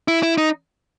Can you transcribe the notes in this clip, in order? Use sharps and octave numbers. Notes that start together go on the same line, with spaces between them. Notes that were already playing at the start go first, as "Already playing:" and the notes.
E4
E4
D#4